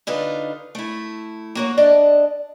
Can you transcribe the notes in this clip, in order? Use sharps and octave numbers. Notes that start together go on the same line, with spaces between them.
D3 D#4 F4 B4
A3 E4
A#3 F#4 C#5
D4 D5 D#5 A5